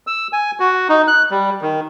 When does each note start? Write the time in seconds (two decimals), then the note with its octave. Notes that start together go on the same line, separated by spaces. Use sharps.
0.07 E6
0.33 G#5
0.60 F#4
0.89 D#4
1.08 F#6
1.31 G3
1.61 D#3